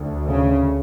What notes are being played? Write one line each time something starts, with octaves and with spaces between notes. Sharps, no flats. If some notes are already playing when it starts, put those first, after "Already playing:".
Already playing: D2
C#3